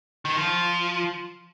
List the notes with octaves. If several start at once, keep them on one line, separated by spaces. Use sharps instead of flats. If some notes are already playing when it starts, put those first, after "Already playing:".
D#3
F3